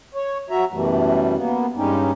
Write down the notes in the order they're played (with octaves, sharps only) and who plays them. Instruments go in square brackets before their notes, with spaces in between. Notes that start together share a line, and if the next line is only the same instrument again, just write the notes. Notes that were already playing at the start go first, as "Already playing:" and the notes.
[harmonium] C#5
F#3 F#4 E5 A#5
F#2 B2 E3 G3 A3
A#3 B3
G2 G3 G#3 C#4 D#4 G4